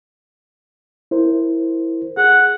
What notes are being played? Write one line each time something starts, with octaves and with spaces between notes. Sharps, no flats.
E4 A#4 C5
G#4 F#5